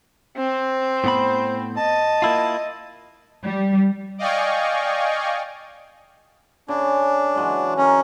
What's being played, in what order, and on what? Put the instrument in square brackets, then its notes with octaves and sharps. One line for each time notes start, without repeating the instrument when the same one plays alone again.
[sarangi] C4 [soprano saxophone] C5
[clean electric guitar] A2 B3 B5
[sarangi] D#5 [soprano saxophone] A5
[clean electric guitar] A#3 E4 F4
[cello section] G3
[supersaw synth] D5 D#5 F5 G5 G#5 C#6
[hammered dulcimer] C#3 [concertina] D4
[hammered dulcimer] E3 F#3 G#3
[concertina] C#4 [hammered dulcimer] A#4 A#5